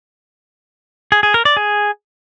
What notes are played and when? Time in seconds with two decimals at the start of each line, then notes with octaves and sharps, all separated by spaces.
1.12 G#4
1.23 G#4
1.34 A#4
1.45 D5
1.57 G#4